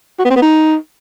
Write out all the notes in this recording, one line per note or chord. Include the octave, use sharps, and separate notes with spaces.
F#4
B3
C4
B3
D#4